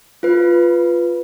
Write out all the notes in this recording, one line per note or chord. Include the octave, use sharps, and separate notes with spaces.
F4 B4